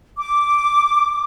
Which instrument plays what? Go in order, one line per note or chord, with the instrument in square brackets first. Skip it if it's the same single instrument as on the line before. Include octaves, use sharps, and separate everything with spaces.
[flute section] D6